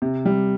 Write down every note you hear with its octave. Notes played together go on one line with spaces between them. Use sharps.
C3
G3